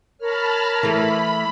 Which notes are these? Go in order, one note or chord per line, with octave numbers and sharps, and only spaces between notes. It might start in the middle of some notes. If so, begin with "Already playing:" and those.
A#4 C#5 A5 B5 F6
E3 A3 B5